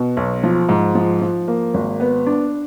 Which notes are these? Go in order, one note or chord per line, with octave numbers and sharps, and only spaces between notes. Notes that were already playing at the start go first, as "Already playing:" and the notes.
Already playing: B2
B1
F3
G#2
F3
F3
A#3
G#1
B3
D4